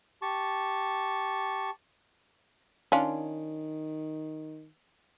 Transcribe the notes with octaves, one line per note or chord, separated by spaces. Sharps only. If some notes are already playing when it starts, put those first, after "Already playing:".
G4 A5 C#6
D#3 C#4 D4 F4